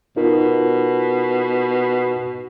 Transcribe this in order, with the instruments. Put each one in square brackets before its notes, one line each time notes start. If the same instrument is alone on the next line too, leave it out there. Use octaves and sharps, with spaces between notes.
[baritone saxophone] B2 [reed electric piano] D#4 F4 A#4